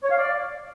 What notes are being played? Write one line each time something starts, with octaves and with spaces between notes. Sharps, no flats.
C#5
F5
D5